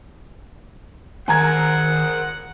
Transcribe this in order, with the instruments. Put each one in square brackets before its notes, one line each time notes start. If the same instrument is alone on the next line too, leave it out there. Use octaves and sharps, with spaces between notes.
[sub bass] D#3 [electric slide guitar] G#4 A#4 C5 [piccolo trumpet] F#5 [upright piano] G#5 A#5 G#6